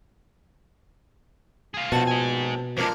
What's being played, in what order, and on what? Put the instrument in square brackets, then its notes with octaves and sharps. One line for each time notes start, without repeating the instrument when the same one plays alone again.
[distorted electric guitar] F4 G#4
[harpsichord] A#1 A5 [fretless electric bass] B2 [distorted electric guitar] F4 F#4
[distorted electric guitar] D#4 G#5
[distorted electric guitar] F2 G#3 [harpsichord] F3 A#3 D4